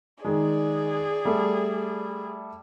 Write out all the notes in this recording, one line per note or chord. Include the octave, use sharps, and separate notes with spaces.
D#3 G#3 G#4 D5
G3 A3